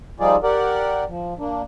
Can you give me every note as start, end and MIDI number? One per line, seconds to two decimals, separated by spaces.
0.20 0.36 53
0.20 0.36 55
0.20 0.36 63
0.20 0.36 65
0.20 0.36 68
0.20 0.36 74
0.43 1.04 67
0.43 1.04 70
0.43 1.04 74
0.43 1.04 78
1.09 1.34 53
1.39 1.62 58
1.39 1.62 62